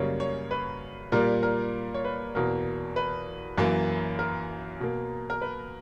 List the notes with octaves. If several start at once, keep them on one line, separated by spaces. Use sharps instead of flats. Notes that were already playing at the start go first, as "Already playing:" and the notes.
Already playing: F#2 C#3 G3 A#3 C#5
C#5
B4
A#2 G3 A#3 A#4
A#4
C#5
B4
E2 B2 A#3 A#4
B4
F#2 E3 A#3
A#4
B2 A#3
A#4
B4